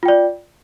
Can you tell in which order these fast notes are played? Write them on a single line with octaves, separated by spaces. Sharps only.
F4 G5 D5